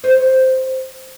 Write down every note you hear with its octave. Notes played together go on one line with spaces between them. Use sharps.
C5 C#5 D#5